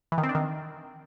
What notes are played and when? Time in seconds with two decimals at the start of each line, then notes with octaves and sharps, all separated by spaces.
0.12 E3
0.18 D#3
0.23 C4
0.29 D4
0.35 D#3